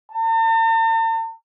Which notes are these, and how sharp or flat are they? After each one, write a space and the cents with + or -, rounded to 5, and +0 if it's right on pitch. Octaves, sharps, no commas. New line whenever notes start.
A5 +45